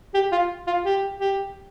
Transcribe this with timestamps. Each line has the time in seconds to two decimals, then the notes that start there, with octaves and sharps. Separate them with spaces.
0.14 G4
0.32 F4
0.67 F4
0.85 G4
1.20 G4